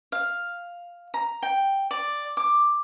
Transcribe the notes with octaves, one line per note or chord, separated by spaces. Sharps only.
F5
A#5
G5
D5
D6